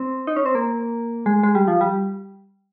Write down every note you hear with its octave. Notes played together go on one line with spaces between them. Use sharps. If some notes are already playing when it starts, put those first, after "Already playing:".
Already playing: C4
D#4
C#4
C4
A#3
G#3
G#3
G3
F3
G3